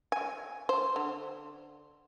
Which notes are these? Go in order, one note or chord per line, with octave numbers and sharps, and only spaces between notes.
G#5
C5
D3